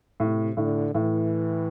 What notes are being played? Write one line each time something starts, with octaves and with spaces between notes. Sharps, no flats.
A2 C3
A2 D3
A2 E3